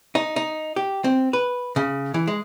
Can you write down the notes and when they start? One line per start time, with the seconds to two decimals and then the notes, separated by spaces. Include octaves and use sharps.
0.15 D#4
0.36 D#4
0.76 G4
1.04 C4
1.33 B4
1.76 C#3
2.14 E3
2.27 G#3